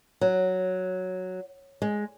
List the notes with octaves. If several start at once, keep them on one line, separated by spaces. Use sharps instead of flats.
F#3
G#3